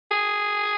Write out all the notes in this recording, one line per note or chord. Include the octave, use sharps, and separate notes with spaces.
G#4